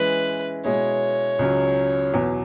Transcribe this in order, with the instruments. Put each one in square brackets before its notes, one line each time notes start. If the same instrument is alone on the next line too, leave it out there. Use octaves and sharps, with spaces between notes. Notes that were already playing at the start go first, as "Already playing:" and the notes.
Already playing: [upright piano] E3 G#3 C#4 E4 [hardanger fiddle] B4
[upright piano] B2 G#3 E4 G#4 [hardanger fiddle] C#5
[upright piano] C#2 C#3 F#3
E2 B2 F#3